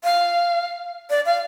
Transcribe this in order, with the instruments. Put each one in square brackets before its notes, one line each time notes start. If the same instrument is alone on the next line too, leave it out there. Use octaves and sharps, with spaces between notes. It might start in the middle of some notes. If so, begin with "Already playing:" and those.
[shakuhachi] F5
D5
F5